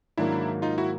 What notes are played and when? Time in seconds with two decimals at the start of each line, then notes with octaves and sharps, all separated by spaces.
0.17 G#2 D#3 F#3 A#3 D4 E4
0.62 D#4 F4
0.78 E4 F#4